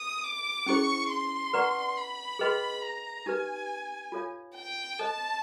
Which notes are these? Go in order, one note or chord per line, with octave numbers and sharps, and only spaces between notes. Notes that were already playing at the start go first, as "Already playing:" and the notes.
Already playing: D#6
D6
C#4 E4 G#4 C5 C#6
C6
B4 D5 F#5 A#5 C#6
B5
G#4 B4 D#5 G5 C6
A#5
D#4 G4 B4 G#5
F4 A4 C#5 F5
G5
A4 C5 D#5 A5